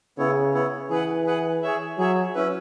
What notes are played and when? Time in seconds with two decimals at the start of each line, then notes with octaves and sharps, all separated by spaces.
0.18 C#3 B3 E4 C#5
0.54 B3 E4 C#5
0.90 E3 G#4 B4 F#5
1.27 G#4 B4 F#5
1.63 G#4 C#5 E5
1.98 F#3 G#4 C#5 E5
2.35 C#4 E4 B4